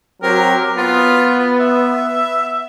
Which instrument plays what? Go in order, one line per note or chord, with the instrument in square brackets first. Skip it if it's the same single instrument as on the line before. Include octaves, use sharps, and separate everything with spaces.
[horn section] F#3 C4 G4 [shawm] A#4
[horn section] B3 [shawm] F4
[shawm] E5